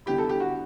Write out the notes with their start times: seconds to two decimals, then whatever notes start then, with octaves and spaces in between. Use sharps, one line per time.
0.06 D3 G3 B3 E4 G4
0.18 A4
0.29 G4
0.40 F#4